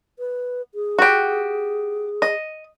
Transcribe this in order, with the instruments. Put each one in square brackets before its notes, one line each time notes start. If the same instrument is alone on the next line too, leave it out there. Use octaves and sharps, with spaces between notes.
[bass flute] B4
G#4
[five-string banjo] F#4 G4
D#5